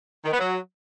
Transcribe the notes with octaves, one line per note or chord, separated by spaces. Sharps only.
D#3
B3
F#3